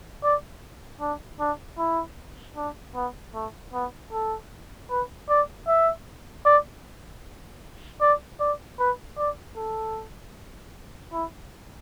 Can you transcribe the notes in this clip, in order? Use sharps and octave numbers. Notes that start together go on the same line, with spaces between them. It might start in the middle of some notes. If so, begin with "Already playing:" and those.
D5
D4
D4
E4
D4
B3
A3
B3
A4
B4
D5
E5
D5
D5
D5
B4
D5
A4
E4